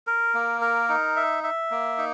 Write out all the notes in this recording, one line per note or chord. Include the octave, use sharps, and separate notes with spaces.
A#4
A#3
A#4
D#4
E5
E5
A#3
D#4